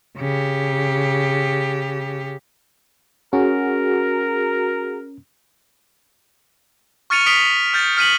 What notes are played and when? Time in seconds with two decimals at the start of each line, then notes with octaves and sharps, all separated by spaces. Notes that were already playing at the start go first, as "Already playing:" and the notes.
0.18 C#3 G4
3.33 C#4 F#4 G#4 A#4
7.10 C#6 F6 A6 C#7 D#7 F7
7.26 D#6 B6 D7 F7 G7
7.74 F6 G6 A6
7.97 F6 B6 D#7 F#7